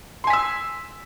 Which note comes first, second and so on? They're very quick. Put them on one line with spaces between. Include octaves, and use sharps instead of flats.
C6 G#5 B6 E6